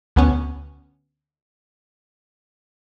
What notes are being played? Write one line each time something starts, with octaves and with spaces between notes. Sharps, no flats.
D2 B3 C#4